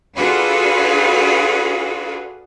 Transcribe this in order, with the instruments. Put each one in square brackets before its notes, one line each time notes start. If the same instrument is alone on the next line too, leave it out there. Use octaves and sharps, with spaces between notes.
[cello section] D4 F4 F#4 G#4 A4 B4